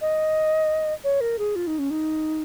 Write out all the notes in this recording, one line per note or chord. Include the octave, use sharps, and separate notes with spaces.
D#5
C#5
A#4
G#4
F4
D#4
C#4
D#4